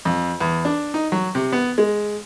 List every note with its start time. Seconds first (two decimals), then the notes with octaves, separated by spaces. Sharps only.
0.05 F2
0.41 E2
0.65 D4
0.94 D#4
1.12 F#3
1.35 C3
1.52 B3
1.78 G#3